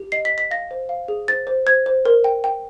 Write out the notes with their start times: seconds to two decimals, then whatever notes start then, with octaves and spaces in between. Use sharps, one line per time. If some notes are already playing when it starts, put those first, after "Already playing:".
Already playing: G4
0.12 D#5 C7
0.25 B6
0.32 D#5
0.38 B6
0.51 F5 A#6
0.71 C5
0.89 F5
1.08 G#4
1.28 C5 A6
1.47 C5
1.66 C5 G#6
1.86 C5
2.05 A#4
2.24 G5
2.44 G5